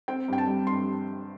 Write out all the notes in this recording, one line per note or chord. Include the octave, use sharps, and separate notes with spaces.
C4 G5
G2 G5
A5
G3
G2 C6